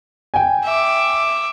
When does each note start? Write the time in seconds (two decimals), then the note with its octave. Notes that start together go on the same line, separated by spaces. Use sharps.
0.34 G5 G#5
0.65 E5 D6